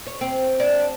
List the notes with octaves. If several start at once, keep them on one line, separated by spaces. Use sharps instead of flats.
C#5
C4
D4